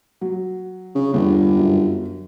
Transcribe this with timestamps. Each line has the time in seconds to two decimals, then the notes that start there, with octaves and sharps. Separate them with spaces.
0.21 F#3
0.95 C#3
1.14 G1 E2
1.58 F#2